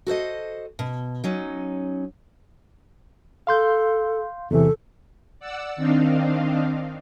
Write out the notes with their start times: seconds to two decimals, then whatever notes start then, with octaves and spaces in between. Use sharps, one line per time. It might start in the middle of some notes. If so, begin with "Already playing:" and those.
0.07 F#4 A4 C5 D#5
0.79 B2
1.24 F#3 C#4 D#4
3.47 A4 F5 C6 G6
4.51 E2 C3 E3 A4
5.40 D5 F#5 E6
5.76 D#3 C4 D4 D#4 F5